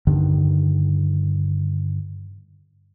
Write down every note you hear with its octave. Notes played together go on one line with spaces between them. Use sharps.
G2 D3 D#3